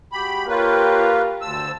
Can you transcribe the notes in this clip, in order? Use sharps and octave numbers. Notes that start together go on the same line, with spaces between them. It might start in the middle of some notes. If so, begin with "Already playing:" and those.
G#3 F#4 G4 B5
A#3 F4 G4 B4 C#5 F5 G5
D2 C5 A5 E6